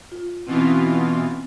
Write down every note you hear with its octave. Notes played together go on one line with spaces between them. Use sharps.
F4
B2 E3 C4 C#4 F4